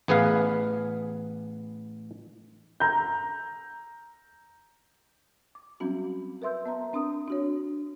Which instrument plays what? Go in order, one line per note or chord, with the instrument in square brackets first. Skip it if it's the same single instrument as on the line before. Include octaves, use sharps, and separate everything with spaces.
[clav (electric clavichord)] A1 B3 G#4 B4 F5
[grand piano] A#5 G6
[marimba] D6
F#3 G3 C4 C#4 F#4
A#4 B4 E5 C6 E6 G6
B3 E5 A#5
C4 D4 A#4 D#6
D4 F#4 C#5